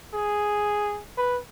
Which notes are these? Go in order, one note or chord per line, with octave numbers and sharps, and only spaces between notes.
G#4
B4